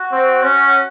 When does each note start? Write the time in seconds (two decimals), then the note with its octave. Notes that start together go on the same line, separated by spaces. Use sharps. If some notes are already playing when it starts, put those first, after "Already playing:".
Already playing: F#4
0.12 C4
0.43 C#4